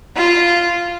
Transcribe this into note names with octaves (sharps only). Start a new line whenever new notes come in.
F4